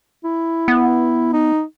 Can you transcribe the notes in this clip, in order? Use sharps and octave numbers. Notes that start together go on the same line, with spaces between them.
E4
B3
D#4